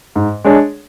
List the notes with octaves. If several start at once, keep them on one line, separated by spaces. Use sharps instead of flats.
G#2
G#3 D4 G#4 C#5